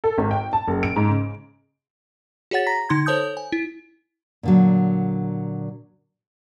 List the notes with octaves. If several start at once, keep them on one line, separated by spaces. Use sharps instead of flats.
A4
G#1
G5
A5
F#1
D7
G#2
C#3
F#4 G#4 C#5 F#5 A6
A#5 A#6 B6
D3 D#4 C6 G#6
A4 C5 C#5 A5 D#6 G6
G#5
E4
A#2 D3 F#3